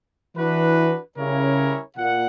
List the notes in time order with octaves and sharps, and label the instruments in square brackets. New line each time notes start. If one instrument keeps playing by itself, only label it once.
[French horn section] E3 [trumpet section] D4 F#4 B4
[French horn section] C#3 [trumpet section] G3 C#4 E4 A#4 C#5
[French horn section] A#2 [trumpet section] F#5